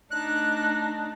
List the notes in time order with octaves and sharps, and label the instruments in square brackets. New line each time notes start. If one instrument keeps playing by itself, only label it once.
[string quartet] A3 D4 D#4 [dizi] F#6